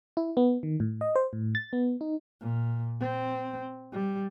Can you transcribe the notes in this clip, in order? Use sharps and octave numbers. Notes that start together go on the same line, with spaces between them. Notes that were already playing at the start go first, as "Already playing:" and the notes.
E4
B3
D#3
A2
D#5
C5
A2
A6
B3
D#4
A#2
C4
G3